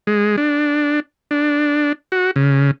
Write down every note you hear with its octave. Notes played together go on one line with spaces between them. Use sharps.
G#3
D4
D4
F#4
C#3